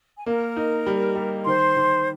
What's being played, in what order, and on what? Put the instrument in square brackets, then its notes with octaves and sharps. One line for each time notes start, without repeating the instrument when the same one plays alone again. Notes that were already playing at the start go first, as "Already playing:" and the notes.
[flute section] G#5
[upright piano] A#3 [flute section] A#4 A#5
[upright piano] D#4
G3
G3
[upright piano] D#3 [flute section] C5 C6
[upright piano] D#3